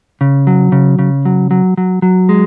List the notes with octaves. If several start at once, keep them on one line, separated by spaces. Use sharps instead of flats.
C#3
F#3
C#3
C#3
F#3
F#3
F#3
F#3
G#3